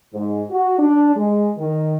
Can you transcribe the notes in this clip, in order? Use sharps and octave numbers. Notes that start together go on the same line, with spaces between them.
G#2
F#4
D4
G#3
D#3